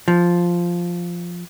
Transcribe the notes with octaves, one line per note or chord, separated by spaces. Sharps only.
F3